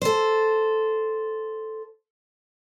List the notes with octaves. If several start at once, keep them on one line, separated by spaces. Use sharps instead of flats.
A4 C5